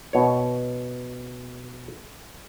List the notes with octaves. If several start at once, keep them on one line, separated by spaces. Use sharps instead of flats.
B2 C#5